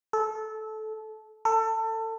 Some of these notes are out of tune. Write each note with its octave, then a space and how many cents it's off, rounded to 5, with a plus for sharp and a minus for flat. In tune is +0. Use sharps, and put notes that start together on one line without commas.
A4 -20
A4 +25